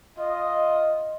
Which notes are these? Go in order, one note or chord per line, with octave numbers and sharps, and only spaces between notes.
F4 D#5